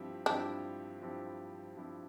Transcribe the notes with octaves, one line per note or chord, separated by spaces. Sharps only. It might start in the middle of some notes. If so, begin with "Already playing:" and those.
Already playing: G2 F3 C4 E4 G4
G2 F3 C4 D4 E4 G4
G2 F3 C4 E4 G4
G2 F3 C4 E4 G4